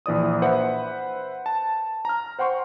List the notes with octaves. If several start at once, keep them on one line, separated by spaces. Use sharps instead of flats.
A#1 E3 D5 D#6
B4 C5 E5 F#5
A5
A#5 F6
C5 F#5 G5 C6 C#6